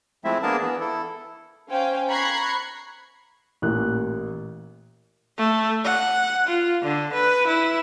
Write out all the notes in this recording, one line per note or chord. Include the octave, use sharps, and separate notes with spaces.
F3 G#3 A3 C4 E4 E5
A#3 B3 D4 G#4 A#4 A5
E3 B3
E4 A4
C#4 C5 F5 G5 G#5
A#5 B5 C#6 F#6 G#6 C7
A1 A#2 F#6
A3
F#5
F4
D3
B4
E4